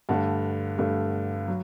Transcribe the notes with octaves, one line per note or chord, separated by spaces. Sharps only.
G2 D3 A3 F#5 A5
G2 D3 A3
F#3